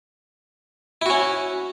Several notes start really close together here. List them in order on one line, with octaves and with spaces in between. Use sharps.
E4 F#4 C#4